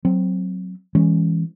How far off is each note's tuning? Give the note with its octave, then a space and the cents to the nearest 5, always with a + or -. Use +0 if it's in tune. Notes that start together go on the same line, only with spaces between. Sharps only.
F#3 +0 C4 +0
E3 +0 G#3 -25 C#4 +0